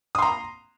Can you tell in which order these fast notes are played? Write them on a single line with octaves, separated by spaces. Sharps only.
D#6 C6 A#5